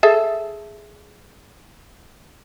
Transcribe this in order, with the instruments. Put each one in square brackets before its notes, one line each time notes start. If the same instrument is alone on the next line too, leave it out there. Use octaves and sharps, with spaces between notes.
[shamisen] G#4 A4 E5